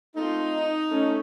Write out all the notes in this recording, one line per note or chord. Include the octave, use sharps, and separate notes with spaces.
A3 C4 D#4 F4
A3 C#4